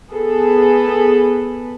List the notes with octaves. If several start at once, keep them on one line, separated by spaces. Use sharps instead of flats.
B3 G#4 A4 B4